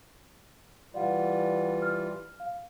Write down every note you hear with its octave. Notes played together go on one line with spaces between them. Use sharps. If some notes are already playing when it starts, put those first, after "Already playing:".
E3 G3 F4 D5 F5 F#5
F6
F5